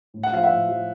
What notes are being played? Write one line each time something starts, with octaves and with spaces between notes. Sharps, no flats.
A2
F#5
F3 F5
E5 F#5
A2
F3